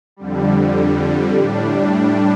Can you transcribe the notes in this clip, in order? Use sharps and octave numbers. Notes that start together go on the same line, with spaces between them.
F2 D3 G3
A2 G3 D4